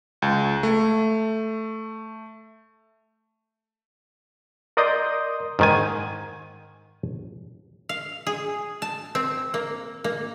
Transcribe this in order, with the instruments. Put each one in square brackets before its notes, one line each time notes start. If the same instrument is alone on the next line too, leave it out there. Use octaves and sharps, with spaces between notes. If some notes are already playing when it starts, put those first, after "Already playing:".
[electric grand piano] C#2
A3
[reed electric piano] A#4 D5 D#5 C6 D#6 G6
[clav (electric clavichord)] G#2 D#3 G#5
[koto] F5
G#4
A5
C4
A#3
A#3